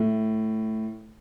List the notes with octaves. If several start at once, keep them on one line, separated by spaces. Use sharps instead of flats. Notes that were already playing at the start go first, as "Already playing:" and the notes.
Already playing: A2